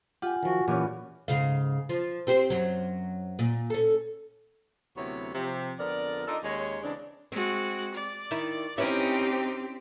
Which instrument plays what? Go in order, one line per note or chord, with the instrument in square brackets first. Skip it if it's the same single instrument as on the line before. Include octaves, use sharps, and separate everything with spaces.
[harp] F4 [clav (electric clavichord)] G4 [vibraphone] F#5 G#5
[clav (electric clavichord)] D#3 F3 [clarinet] F#4
[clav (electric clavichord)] A#2 [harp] E3 C#4 [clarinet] G4
[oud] G#2 C#3 F5
F3
C4 G4 C5
F#2 F#3
A#2
C#4 A4
[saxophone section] D2 C3 F#3 B3 E4 C#5
C3 F3
F2 D3 B3 A#4 D5
D4 D#4 F4 A4 D#5
D#2 G#3 C#4 D#4 C#5
C#3 E3 G#3 C4 D4
[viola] G#3 F#4 [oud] C4
[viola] D5
[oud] D#3 E4
[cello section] C4 G4 [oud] C#4 E4 B4 [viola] D#4